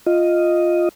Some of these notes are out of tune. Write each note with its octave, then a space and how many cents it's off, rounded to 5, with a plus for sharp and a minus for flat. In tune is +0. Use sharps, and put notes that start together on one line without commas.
F4 +0 D#5 +0